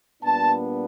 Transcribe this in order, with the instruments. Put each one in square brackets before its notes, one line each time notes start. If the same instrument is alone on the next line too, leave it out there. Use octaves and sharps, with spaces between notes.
[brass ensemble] A#2 G3 B3 D4 A5